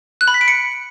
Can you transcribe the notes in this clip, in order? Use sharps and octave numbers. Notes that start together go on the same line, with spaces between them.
F#6
B5
B6
D7
C#7